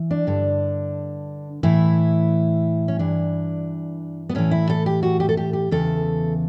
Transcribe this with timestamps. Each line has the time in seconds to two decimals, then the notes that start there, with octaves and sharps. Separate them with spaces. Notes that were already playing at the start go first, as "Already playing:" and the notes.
Already playing: E3
0.11 D4
0.27 G2 D3
1.63 A2 E3 E4
2.88 C#4
2.99 G2 E3 D4
4.29 B3
4.35 A2 E3 C#4
4.51 E4
4.70 A4
4.86 G4
5.03 F#4
5.20 G4
5.29 A4
5.37 G4
5.53 G4
5.71 E2 C#3 E3 A4